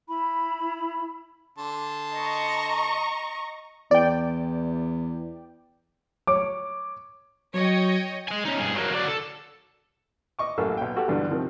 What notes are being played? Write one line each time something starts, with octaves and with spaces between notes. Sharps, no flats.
E4 B5
D3 A5 C6
D#5 A#5 C#6
E2 D5 G5
C#5 D6
F#3 C#5 D#5 G5
D#5 G#5
C#4 D#4
G2 G#4
F#3 A#3
F#3 D5
A4
D#5 C#6 D6
A1 F#2 A#3 A4
B1 G5
F#4 G4 A4
B1 G2 D3 E3
C3 D#3 F3 C4 A#4